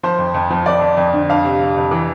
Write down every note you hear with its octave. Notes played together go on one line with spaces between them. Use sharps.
F3 C5
F2
F2
F3
F2 D5
F2
F2
D3
F2 F5
C3
C3
F2
E3